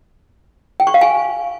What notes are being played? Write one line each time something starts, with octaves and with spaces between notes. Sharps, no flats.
G5
C#6
F5
G#5